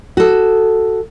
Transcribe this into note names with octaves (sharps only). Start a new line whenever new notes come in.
F#4 A4